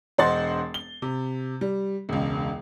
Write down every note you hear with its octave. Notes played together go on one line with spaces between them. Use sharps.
E1 C5 D#5 F#5 C6 A6
G7
C3
G3
E1 C#2